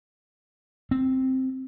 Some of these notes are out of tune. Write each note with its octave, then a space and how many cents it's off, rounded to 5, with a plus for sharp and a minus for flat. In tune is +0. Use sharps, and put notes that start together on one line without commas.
C4 +0